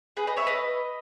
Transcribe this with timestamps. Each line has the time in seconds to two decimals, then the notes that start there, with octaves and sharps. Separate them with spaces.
0.17 G#4 B4
0.27 B4 D#5
0.37 C#5 E5
0.47 B4 D#5